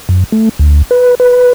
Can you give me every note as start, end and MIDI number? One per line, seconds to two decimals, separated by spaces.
0.09 0.24 42
0.32 0.49 57
0.59 0.82 38
0.91 1.15 71
1.20 1.53 71